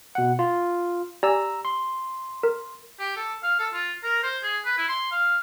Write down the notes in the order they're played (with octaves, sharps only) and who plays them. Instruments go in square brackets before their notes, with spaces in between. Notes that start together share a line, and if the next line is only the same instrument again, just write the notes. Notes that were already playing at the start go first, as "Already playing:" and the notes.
[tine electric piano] B2 F#5
F4
[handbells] G4 D5 G#5 [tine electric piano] A#5 E6
[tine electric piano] C6
[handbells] A#4
[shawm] G4
A4
F5
A4
F4
A#4
C5
G#4
B4
E4
C6
F5